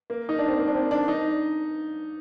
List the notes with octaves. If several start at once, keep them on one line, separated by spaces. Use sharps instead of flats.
A#3
D#4
D4
C4
A#3
D4
C4
D4
D#4